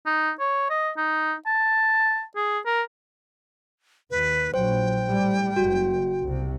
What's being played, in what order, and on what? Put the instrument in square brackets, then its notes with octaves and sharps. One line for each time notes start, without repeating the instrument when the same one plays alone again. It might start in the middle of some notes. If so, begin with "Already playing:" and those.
[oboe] D#4
C#5
D#5
D#4
A5
G#4
A#4
[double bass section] D#2 [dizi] B4
[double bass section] A#1 F#3 [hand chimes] C5 [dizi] G5
[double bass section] A2 G3
[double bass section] F#1 [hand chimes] F#4
[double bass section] C2 C3